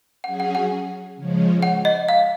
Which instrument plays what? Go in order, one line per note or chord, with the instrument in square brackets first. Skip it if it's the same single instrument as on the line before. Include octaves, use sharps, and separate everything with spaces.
[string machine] F#3 C#4 G#4 [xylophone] F#5
[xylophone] F#5
F#5
[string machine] C#3 F3 G#3 C#4
[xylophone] F#5
D#5
F5